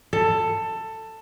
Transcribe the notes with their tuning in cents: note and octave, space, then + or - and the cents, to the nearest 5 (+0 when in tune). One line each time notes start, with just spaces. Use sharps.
A4 +15